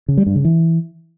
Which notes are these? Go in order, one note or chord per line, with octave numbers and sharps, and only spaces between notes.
C#3
G3
G2
C#3
E3